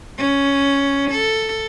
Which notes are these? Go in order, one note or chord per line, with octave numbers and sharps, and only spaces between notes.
C#4
A4